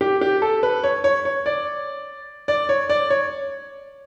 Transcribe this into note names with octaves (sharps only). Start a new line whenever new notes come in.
G4
G4
A4
B4
C#5
C#5
C#5
D5
D5
C#5
D5
C#5